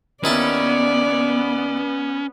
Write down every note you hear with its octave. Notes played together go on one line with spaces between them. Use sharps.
D#2 B3 C#4 E4 D5 A5